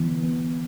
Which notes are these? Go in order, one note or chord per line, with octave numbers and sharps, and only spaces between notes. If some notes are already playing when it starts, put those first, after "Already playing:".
Already playing: D3 E3 B3
B3